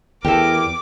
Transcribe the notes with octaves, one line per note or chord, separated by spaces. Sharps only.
E2 A3 E4 G4 A4 A#4 D6